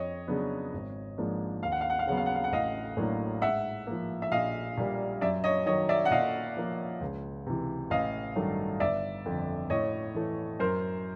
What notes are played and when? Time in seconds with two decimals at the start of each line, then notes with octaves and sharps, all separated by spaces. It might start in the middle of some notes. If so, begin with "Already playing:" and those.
Already playing: F2 C#5 D#5
0.28 C#3 F#3 B3 D4
0.73 G#1
1.18 G#2 F3 A#3 D4
1.63 D#2 F5
1.72 F#5
1.81 F5
1.90 F#5
1.99 F5
2.07 C#3 F#3 B3 F#5
2.17 F5
2.26 F#5
2.35 F5
2.44 F#5
2.52 A1 D#5 F5
2.97 A2 F#3 A#3 D4
3.42 G#2 E5 F#5
3.87 F3 A#3
4.22 E5
4.32 A#1 D#5 F5
4.77 A#2 G3 A#3
5.21 F#2 D5 E5
5.44 C#5 D#5
5.66 D#3 F#3 C#5 D#5
5.89 D5 E5
6.05 F#5
6.11 A#2 D#5 F5
6.57 F3 A#3
7.01 C#2
7.47 C3 E3
7.90 A1 D#5 F5
8.36 G2 D#3 F#3 A3
8.80 G1 D5 E5
9.26 F2 D3
9.70 A2 C#5 D#5
10.15 E3 A3
10.60 F#2 A#4 C5